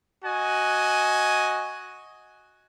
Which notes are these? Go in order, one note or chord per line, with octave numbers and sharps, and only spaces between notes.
F#4 D#5 G#5